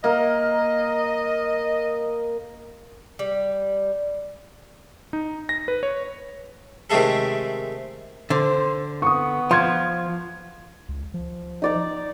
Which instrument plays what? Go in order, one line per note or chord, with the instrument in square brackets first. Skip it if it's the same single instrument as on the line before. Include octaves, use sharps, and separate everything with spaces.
[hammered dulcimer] A#3 A#4 [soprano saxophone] D#5
[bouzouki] G3
[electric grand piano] D#4
A#6
B4
C#5
[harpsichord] C3 D#3 G#3 A3 G#4 A4
[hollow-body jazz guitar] D3 [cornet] C5
[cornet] B3 [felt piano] C#6 D#6
[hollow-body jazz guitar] F3 [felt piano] C6 G#6
[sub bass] C#2
F3
[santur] D#4 D5 A#5